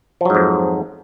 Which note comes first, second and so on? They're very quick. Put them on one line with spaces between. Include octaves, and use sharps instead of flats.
F3 F#3 G#2 F2